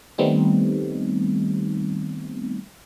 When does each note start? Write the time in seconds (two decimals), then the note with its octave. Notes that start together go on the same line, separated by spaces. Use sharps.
0.18 D#3 G3 A3 B3 C4 D#4